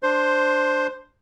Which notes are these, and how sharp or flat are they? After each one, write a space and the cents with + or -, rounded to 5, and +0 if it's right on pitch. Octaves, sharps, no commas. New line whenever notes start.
D4 +0 C5 +0 C6 +15